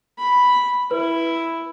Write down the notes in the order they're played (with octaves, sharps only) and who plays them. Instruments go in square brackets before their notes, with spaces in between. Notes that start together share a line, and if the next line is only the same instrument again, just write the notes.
[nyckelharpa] B5
[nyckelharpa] E4 [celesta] B4